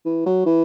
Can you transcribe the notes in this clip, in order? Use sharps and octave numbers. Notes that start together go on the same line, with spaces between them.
E3
F#3
E3